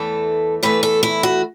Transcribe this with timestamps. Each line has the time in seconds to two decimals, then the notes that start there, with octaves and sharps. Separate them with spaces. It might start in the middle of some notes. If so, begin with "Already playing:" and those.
Already playing: E2 E3 A3 A4
0.63 E2 E3 A3 B4
0.83 A4
1.03 E4
1.23 F#4